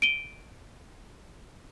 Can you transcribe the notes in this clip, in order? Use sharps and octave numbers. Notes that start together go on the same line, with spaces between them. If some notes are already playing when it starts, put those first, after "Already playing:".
D7 D#7 G7